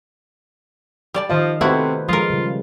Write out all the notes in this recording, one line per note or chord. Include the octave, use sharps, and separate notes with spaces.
G3 D5 A5
D#3 F3 D#5 F5
C3 A3 E4 F#4 B4 C5 E5
F3 G#3 F4 A#4 D#5
C#3 G3